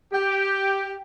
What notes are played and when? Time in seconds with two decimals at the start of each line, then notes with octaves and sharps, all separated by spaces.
0.13 G4